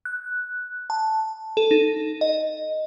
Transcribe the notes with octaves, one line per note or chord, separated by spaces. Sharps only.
F#6
A5
A4
D#4
D#5